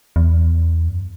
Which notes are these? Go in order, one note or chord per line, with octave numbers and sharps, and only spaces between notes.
E2
F#2